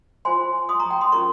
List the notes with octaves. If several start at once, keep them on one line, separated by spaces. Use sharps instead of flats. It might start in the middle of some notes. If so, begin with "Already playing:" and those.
F4 C5 G#5 C6
C6 D#6
A#5 C#6
G5 A#5
C6 D#6
C#4 F4 A#4 A#5 C#6